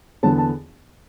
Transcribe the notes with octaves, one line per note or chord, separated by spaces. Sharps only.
E2 D3 B3 A5
A5